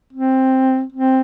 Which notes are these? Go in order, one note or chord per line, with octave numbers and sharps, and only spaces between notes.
C4
C4